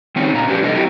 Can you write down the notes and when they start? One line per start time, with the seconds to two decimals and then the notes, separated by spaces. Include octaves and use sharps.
0.16 D#3 C4 C#4 D#4
0.34 A#2 C#3 A#5
0.47 C#4 D4 G4 B4
0.62 C3 D4 D#4 A4 C5 D#5
0.75 F#3 C4 E4 G4 A#4